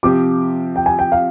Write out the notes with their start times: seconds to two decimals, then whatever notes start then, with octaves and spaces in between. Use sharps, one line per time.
0.03 C3 F3 C4 G4 D6
0.76 G5
0.86 G#5
0.99 G5
1.12 F5